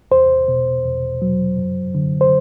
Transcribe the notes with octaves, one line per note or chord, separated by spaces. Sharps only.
E2 C5
B2
E2
F#3
F#2
D3
C5